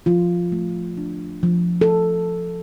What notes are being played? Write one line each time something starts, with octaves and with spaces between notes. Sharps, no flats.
F3 F4
A3
D4
F3
A4